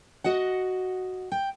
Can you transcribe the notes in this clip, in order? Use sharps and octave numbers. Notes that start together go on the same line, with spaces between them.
F#4 D#5 F#5
G5